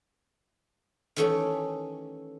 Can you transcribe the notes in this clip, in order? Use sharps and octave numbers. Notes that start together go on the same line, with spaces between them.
D#3 E3 A3 C#4 G4